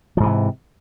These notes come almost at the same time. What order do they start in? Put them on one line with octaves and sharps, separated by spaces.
F3 G#2 E3 C3